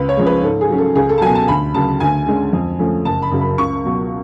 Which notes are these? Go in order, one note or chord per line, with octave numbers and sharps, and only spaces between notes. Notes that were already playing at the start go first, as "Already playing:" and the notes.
Already playing: C#2 B4
C#5
C#3 F3 G#3
B4
G#2 A4
G#4
F#3 C#4
A4
C#2 G#4
A4
A5
B2 F#3 G#5
A5
D2 B5
C#3 F#3 A5
D2 G#5
D3 G#3 C#4
F2
F3 A3 C#4
F#1 A5
B5
F#2 C#3 F#3
B5
C#2 C#6
B2 F#3